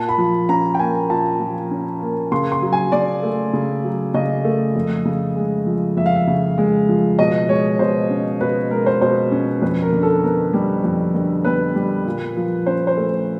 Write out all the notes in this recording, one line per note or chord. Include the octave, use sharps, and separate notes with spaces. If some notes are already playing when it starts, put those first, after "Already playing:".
Already playing: A#2 A5
B5
F3
C#4 A#5
G5
A#3 G#5
A#2 A5
F3
C#4
A#3
C#3 C6
C6
F#3
G#5
C#3 D5
A3
C#3
F#3
C#3 D#5
A3
F2
C#3
G#3
F3
F2 E5
F5
E5
C#3
G#3
F3
B2 D#5
G#3 C#5
B2 C5
C#4
B2 B4
G#3 A#4
C5
B2 C5
C#4
F2 B4
A#4
D3
A4
B3 A#4
G3
F2
D3
B3 B4
G3
A#2
F3
C#4 C5
C5
A3